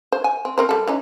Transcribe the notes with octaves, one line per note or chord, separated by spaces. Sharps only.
C5
G#5
C4
C4 A#4 C5
G3 A4
E3 C#4 D#4